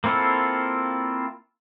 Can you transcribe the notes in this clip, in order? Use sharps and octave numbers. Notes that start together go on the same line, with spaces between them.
A#3 C4 E4 F4 A4